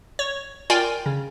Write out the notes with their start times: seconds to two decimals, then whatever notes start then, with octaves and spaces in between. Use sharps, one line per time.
0.19 C#5
0.70 F4 A#4 D5 G5 G#5 C6
1.06 C#3